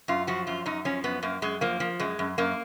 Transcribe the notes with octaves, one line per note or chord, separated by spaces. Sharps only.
F#2 F4
F3 F#4
F#2 F4
F#2 D#4
F3 C#4
F#2 B3
F#2 A#3
F#2 G#3
F3 A#3
F3
F#2 G#3
F#2
F#2 A#3